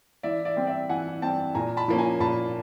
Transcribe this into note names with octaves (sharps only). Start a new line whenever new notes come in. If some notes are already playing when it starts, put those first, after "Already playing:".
E3 D5 E5
D5 E5
G3 C4
D5 E5
E3 F#5 G#5
G3 C4 G5 A5
A#2 G#5 A#5
A5 B5
F3 A#3 C#4
G#5 A#5
A#2 A5 B5